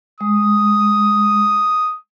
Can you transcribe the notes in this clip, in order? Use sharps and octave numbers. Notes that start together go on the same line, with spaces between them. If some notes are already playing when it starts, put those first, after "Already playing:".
G#3 D#6